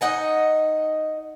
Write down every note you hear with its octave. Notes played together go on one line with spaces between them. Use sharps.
D#4 D#5 F#5 G#5